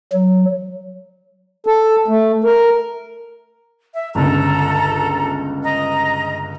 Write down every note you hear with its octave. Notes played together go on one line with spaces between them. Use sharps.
F#3
A4
A3
A#4
E5
G1 C#2 A4 A#5
D#5 A#5